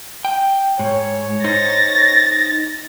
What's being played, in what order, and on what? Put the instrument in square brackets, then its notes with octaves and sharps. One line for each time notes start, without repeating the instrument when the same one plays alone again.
[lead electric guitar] G5
[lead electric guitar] G#2 [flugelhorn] C#5
[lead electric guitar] D#4 C5 [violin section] A6 A#6